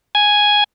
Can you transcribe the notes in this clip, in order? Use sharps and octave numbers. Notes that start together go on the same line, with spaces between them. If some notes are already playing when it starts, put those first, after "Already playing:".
G#5